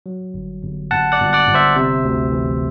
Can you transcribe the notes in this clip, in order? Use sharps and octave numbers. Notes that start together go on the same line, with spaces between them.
F#3
G1
G1
G1 F#5 A5
D5 F#5
G1
D5 F#5
G1
C5 E5
C3
D2
E3